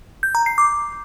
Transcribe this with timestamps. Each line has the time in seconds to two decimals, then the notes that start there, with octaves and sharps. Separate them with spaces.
0.23 G6
0.35 A#5
0.46 C7
0.58 D6